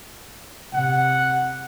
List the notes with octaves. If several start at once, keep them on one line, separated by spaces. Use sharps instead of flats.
C3 F#5